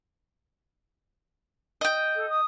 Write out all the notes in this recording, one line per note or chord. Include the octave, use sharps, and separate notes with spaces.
D#5 G5
A4
D#6